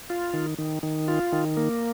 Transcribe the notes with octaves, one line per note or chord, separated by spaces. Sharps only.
F4
D#3
D#3
D#3
F4
D#3
A#3